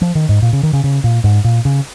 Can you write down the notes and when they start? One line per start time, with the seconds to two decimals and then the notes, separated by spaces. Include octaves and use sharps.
0.02 F3
0.15 D#3
0.29 G#2
0.42 A#2
0.53 C#3
0.63 D#3
0.73 C#3
0.84 C#3
1.04 A#2
1.24 G#2
1.44 A#2
1.65 C#3